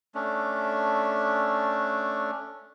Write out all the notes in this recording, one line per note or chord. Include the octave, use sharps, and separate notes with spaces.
A3 C#4 D4